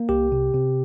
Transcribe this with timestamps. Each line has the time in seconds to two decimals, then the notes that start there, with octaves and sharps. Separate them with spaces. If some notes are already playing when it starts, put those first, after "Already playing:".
Already playing: A#3
0.09 C2 G4
0.32 C3
0.54 C3